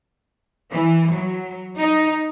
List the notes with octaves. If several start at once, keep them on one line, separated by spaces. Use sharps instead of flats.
E3
F#3
D#4